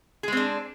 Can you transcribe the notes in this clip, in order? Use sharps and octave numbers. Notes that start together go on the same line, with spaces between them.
G#3 C4 D4 G#4